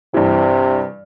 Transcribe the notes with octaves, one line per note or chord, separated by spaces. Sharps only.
G2 C3 E3